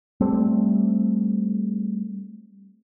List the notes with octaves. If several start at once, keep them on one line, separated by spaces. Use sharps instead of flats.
G3 A3 C4